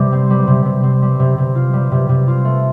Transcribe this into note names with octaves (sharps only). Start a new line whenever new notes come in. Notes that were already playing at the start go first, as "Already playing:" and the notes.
Already playing: C3 G3
C4
G3
C3
C3
C4
G3
C3
C3
F4
G3
C3
C3
F4
A3